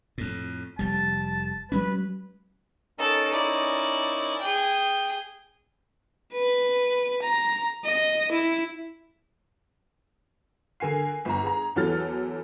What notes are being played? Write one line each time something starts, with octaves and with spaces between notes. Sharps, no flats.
F2 A2
F1 G3 A5
F#3 G#3 C#4 B4
C#4 D#4 A4 A#4
E4 D5
G#4 G5
B4
A#5
D#5
E4
D3 A#4 G#5 C7
G1 A#5
G#4 A#5
E2 E3 F#3 A4 F6 A6